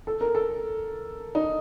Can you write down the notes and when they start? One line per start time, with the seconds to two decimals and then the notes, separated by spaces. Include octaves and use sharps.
0.07 A4
0.21 A#4
0.35 A4
1.35 D#4